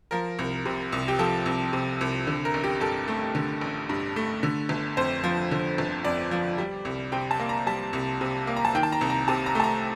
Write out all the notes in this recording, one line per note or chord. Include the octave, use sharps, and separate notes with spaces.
F3 A#4
C2
C3
C2
G4
F3 A4
C2
C3
C2
D3
A#4
A1
G4
G2 A4
A3
D3
A1
G2
A3
D3
G1
F2 C5
F3
D3
G1
F2 D5
F3
G3
C2
C3 G5
A5
A#3
A#5
G3 A5
C2
C3
A#3
A#5
A5
D#3 G5
A5
A#5
C2
A#5
C3 A5
A#5
A3 A5
A#5